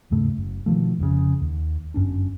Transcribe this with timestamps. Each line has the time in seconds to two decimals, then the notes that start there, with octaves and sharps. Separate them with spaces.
0.10 D#2 G#2 C#3 A3
0.37 F#1
0.66 B2 D#3 F3 A3
0.99 F1 F2 A#2 C#3
1.41 D#2
1.94 G1 F#2 C#4 D4